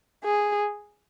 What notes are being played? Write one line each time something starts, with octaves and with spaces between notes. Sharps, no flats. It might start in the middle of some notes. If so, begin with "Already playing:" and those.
G#4